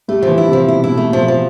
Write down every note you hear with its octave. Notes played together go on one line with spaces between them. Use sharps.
G3 A3
F3
E3
E4
C3
F3
B2 E4
B2 E4
A3
B2
F3
F3